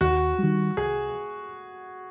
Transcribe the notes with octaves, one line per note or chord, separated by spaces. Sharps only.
D#2 F#4
D#3 G3
C2 G#4